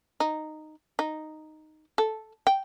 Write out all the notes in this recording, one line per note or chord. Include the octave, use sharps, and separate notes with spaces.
D#4
D#4
A4
G5